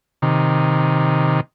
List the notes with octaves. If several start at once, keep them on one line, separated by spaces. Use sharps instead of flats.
C3 D#3